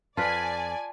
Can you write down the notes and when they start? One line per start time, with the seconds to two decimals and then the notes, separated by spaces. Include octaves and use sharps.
0.17 F2 F4 B4 D5 G#5 A5